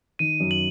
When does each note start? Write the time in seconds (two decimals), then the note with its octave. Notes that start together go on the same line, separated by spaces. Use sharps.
0.19 D#3 D#7
0.40 F#2
0.51 F#7